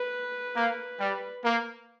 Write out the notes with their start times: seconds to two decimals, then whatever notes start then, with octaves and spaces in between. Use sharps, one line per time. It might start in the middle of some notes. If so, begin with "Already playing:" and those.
Already playing: B4
0.55 A#3
0.99 G3
1.44 A#3